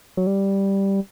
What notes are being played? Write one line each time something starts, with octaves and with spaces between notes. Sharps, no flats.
F#3
G3